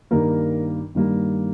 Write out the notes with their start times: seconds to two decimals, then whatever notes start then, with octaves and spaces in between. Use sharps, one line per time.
0.11 G2 D#3 G3 A#3 A#4
0.95 G2 D#3 G3 A#3